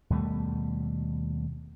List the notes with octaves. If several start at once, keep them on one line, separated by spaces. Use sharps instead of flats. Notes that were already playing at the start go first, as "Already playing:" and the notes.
D#2 B2 G3 A3